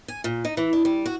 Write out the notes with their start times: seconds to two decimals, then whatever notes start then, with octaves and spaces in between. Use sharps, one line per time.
0.08 G#5
0.24 A#2
0.45 D#4
0.57 E3
0.73 D4
0.85 G3
1.06 F#4